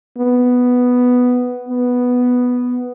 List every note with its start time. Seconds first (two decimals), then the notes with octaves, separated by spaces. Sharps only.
0.18 B3
1.68 B3